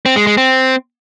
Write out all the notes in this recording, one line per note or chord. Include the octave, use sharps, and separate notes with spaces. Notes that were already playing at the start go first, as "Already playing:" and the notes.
C4
G#3
G#3
C4